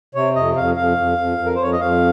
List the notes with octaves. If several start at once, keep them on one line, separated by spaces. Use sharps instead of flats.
C3 C#5
F2 D#5
F2 F5
F2 F5
F2
F2
F2
A#4
C5
F2 C#5
D#5
F2 F5